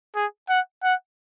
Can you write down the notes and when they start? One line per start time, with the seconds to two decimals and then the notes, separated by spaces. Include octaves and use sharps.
0.15 G#4
0.49 F#5
0.83 F#5